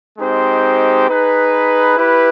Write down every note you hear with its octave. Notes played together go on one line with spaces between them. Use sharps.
G#3 C4 D#4 G4 C5
D#4 G#4 B4
E4 G4 B4